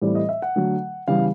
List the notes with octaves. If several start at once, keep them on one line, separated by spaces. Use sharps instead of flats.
A2 E3 G3 C4 D5
D#5
E5
F#5
D3 F#3 A3
C#3 E3 G3 B3 F5